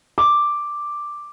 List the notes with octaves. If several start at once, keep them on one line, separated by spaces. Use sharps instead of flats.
D6